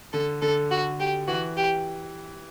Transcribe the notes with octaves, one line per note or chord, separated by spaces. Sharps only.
D3 A4
D3 A4
F#4
G4
E3 F#4
G4